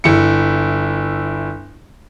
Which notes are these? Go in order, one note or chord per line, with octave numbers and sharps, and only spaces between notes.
G1 E4 C#7